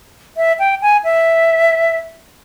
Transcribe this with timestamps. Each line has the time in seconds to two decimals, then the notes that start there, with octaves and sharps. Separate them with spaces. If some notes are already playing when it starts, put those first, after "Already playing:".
0.37 E5
0.59 G5
0.82 G#5
1.04 E5